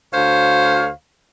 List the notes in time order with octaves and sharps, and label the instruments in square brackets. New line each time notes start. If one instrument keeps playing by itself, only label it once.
[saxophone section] D2 C5 C#5 F5